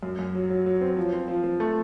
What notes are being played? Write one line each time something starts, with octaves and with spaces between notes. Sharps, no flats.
F#2
F#2
F#3
F#3
F#3
C4
F3
C4
F3
F3
A3